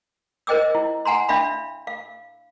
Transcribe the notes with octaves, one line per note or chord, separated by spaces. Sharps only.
A#4 C5 D#5 G5 D6 E6
E4
F#5 G#5 A#5 C6
D4 E5 F5 B5
F5